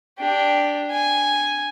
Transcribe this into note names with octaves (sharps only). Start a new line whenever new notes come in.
D4 G4
G#5